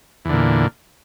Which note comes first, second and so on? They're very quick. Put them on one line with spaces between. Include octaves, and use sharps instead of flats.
E2 D3 A#2